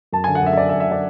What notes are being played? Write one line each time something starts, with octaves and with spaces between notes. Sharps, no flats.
F#2 A5
G#5
D3
F#5
F#2 E5
E5
D3 D5
E5
F#2
E5
D3 D5